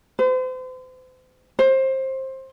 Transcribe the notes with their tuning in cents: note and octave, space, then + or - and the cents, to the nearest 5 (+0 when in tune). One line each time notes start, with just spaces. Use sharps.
C5 -40
C5 +20